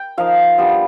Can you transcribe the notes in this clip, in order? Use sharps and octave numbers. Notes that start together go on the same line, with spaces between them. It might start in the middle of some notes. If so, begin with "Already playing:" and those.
Already playing: G5
F3 A#3 D#4 F5
G3 B3 D4 F4 F5